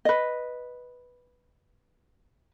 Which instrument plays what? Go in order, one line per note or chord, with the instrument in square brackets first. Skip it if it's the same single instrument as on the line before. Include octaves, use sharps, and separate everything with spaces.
[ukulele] B4 D#5